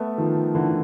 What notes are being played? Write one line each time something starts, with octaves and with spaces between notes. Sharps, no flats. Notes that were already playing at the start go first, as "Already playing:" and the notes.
Already playing: A3 B3
D#3 F3
D3 E3